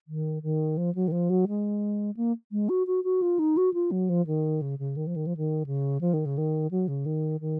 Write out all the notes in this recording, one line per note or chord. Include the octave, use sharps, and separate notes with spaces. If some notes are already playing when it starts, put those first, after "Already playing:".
D#3
D#3
F3
F#3
D#3
F3
F#3
G#3
A#3
G#3
F#4
F#4
F#4
F4
D#4
F#4
F4
F#3
F3
D#3
C#3
C#3
D#3
F3
D#3
F3
D#3
C#3
F3
D#3
C#3
D#3
F#3
C#3
D#3
D#3